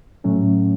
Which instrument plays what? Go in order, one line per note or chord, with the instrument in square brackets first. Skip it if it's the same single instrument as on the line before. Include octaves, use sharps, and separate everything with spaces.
[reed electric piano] A2 F#3 A3 C#4